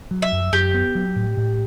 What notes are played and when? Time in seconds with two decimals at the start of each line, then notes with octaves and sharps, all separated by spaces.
0.11 F#3
0.22 E5
0.32 F#2
0.53 F#2 G4
0.74 B3
0.95 F#3
1.16 A2
1.37 A2